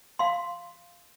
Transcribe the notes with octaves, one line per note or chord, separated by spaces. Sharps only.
F5 C6